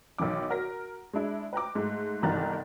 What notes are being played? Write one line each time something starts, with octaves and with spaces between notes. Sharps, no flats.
B1 D#3 E3 D6
F#4 A#4 A#6
G#3 D4 E4
B4 G5 A#5 D6
G#2 A3
G1 C2 D#3 E3 A#5 A6